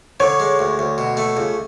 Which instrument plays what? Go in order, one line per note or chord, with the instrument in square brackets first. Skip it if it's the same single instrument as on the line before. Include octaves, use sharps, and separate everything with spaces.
[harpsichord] D3 [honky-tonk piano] C#5
[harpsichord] G#3
D2
D2
B2
A3
C#2